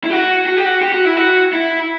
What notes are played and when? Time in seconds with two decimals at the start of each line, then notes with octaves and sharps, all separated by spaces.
0.04 E4
0.10 F#4
0.46 F#4
0.56 G4
0.66 F#4
0.81 G4
0.93 F#4
1.05 E4
1.16 F#4
1.53 E4